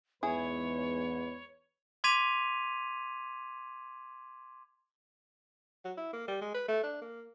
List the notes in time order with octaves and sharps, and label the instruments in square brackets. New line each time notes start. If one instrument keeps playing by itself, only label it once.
[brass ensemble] E2 G#2 [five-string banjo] E4 G#4 [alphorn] B4 [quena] C#5
[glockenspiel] C6 D6 G#6 B6 D#7 F7
[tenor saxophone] F#3
E4
A#3
G3
G#3
B4
A3
D4
A#3